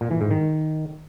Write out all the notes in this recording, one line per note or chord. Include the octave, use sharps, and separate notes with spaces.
A#2
E3
G#2
D#3